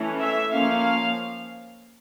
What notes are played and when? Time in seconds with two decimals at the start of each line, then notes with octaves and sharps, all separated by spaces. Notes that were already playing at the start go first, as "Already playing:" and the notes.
Already playing: E3 A3 C#4
0.18 E5
0.52 F3 A#3 C#4 F5